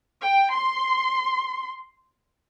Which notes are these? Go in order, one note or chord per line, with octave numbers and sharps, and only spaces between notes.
G5
C6